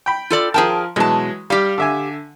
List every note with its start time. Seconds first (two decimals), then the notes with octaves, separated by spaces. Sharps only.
0.06 G5 B5
0.30 F4 A4 D5
0.54 F3 G#4 A#4 G5 A5
0.96 B2 E3 F#3 G#3 A5
1.50 G3 G4 F5
1.78 D3 E5 G#5